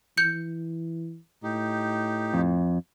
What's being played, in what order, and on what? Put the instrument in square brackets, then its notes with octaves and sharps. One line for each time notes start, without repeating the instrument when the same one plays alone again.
[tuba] E3 [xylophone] G6 C#7
[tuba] A2 [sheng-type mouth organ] D#4 G4
[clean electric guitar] F2